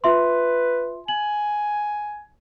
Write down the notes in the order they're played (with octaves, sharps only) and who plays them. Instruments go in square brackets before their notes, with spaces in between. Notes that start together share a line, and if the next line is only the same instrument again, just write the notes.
[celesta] F4 E5 C6 [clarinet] B4
[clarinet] G#5 [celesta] F#7